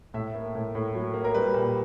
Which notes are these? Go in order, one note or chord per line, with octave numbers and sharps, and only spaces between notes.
A2 E5
A#3
A2
A2
F#3
A#3
A#4
G3 B4
A#2